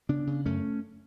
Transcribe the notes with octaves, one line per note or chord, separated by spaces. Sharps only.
C#3 B3 D4
C#3
F#2 A3 C#4